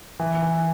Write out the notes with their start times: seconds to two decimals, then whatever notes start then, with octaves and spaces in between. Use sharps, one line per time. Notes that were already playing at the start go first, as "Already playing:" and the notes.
0.20 E3
0.43 E3